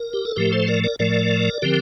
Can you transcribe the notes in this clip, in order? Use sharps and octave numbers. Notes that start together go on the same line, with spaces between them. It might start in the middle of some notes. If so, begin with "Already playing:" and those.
Already playing: A#4
G4
A4
A2 F3 A3 G4 A#4
A4 C5
A#4 D5
A#4 D5
A2 F3 A3 A#4 D5
D3 F3 C4 G4 A#4